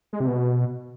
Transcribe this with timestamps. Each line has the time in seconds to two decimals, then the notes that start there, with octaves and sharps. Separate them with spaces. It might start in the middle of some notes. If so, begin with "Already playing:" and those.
0.13 G#3
0.20 C3
0.27 B2